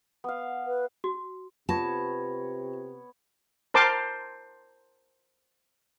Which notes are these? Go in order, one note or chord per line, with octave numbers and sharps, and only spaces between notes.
B3 F5
B4
F#4
C3 B3 F4 C#5 A5 A#6
A#4 C5 A5 C6 D6